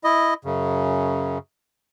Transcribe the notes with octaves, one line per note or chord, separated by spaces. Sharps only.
E4 D#5
F#2 C#3